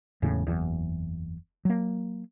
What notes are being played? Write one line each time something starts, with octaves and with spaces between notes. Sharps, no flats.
E1 E2 A2 C#3
F#1 E2
F#3 A#3